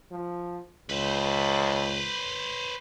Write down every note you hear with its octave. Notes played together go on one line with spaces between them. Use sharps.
F3
C#2 B4 C5